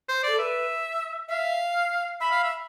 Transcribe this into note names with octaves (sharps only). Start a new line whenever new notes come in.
C5
A4 D5
B4 E5
E5 F5
E5 B5
F5
E5